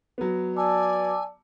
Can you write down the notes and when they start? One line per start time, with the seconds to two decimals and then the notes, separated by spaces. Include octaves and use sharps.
0.18 F#3 B3
0.57 D5 G#5 A5 D6 E6